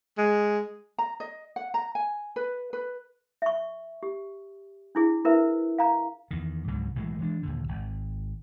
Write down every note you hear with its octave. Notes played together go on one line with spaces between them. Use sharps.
G#3
A#5
D#5
F#5
A#5
G#5
B4
B4
E5 C#6
G4
D4 E4 G#4
E4 A#4 B4 E5
F5 A#5
E2 D#3
C#2 G#2 B2 F#3
B1 A2 E3 G#3
E3 G#3 D4
D#2 A#2 D3
G#1